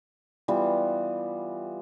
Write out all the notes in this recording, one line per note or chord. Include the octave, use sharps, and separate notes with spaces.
E3 G3 B3 F4